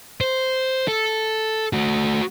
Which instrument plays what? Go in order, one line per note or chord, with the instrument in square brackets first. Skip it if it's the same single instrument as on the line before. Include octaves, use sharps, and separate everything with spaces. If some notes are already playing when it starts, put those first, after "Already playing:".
[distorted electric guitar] C5
A4
A3 F#4